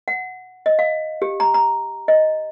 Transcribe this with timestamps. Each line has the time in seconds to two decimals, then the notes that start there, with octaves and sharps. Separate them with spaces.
0.08 F#5
0.66 D#5
0.79 F5
1.22 G4
1.40 A#5
1.54 A#5
2.08 D#5